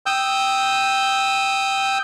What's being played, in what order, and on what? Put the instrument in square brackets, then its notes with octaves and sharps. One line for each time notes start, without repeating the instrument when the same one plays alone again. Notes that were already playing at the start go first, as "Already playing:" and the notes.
[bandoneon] G5 D#6 E6 G6